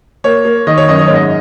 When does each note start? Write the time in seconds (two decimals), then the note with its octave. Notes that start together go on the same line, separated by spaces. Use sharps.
0.24 A#3 C#5
0.45 A#3
0.67 D#3 D#5
0.78 C#5
0.89 F#2 D#5
0.99 D#5
1.07 G#2 C#5
1.15 D#5